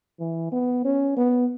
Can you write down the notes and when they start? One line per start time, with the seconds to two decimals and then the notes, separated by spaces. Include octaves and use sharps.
0.20 E3
0.52 B3
0.84 C#4
1.17 B3